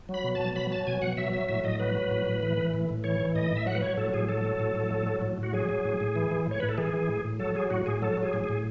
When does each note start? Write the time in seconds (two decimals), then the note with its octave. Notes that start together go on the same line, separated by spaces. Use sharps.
0.09 F#3
0.14 B5
0.24 B2
0.35 B2 A5
0.56 F#3 B5
0.71 F#3 A5
0.87 B2 G#5
1.02 B2 F#5
1.17 F#3 E5
1.33 F#3 E5
1.49 A2 E5
1.64 A2 D#5
1.80 F#3 B4
1.95 F#3
2.11 A2
2.26 A2
2.43 E3
2.57 E3
2.74 A2
2.89 A2
3.04 E3 C#5
3.20 E3
3.35 A2 D#5
3.51 A2
3.56 E5
3.66 F#3 F#5
3.75 B4
3.82 F#3 C#5
3.97 A2 A4
4.14 A2 G#4
4.29 F#3 A4
4.45 F#3
4.60 A2
4.76 A2
4.91 F#3
5.07 F#3
5.22 A2
5.38 A2
5.43 F#4
5.53 F#3 G#4
5.69 F#3
5.85 A2
6.00 A2
6.16 E3
6.31 E3
6.47 A2 C#5
6.60 A2 B4
6.69 A4
6.78 E3 G#4
6.94 E3
7.08 A2
7.24 A2
7.39 F#3 A4
7.55 F#3 G#4
7.70 A2 F#4
7.86 A2 G#4
8.02 F#3 A4
8.17 F#3
8.23 G#4
8.33 A2
8.44 A2 G#4